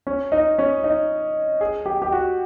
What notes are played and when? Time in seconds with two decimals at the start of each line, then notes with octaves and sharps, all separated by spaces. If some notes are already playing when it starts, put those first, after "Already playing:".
0.07 C#4
0.32 D#4
0.58 C#4
0.84 D#4
1.61 G#4
1.86 G4
2.02 G4
2.12 F#4